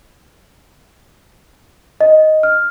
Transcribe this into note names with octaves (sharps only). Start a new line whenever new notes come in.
D#5
F6